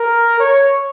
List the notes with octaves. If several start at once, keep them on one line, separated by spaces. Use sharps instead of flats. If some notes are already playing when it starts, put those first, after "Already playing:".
Already playing: A#4
C#5